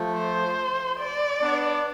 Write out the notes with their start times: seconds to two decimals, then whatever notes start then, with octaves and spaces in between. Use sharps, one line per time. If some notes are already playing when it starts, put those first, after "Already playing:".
Already playing: F3 A3
0.15 C5
1.00 D5
1.42 B3 D4